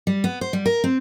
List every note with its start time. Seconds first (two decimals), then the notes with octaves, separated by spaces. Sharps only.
0.07 G3
0.24 B3
0.41 C5
0.53 G3
0.66 A#4
0.84 C4